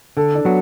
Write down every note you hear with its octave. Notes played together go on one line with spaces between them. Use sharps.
D3 A4
D4
F#3 B3 F#4